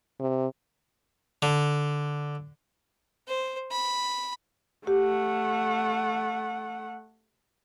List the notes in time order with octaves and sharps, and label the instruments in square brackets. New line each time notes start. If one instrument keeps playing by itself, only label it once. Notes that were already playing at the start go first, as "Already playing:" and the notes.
[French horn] C3
[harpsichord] D3
[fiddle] C5
B5
[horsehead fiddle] A3 F#5 [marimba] G4